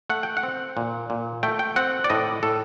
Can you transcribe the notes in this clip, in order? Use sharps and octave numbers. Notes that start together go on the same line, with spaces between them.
A3 F#5
G5
F#5
C4
A#2
A#2
A3 G5
G5
C4 F#5
D5
A2 D#5
A2 A4